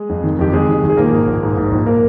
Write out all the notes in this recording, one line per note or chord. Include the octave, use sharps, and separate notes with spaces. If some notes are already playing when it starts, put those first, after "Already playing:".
Already playing: G#3 G#4
F2
D#3
F2 G4
D#3 G#3 G#4
D#3
D#3
G#4
A#1 A#3 A#4
G#2
A#1
G#2
G#2
A#1
A#3 A#4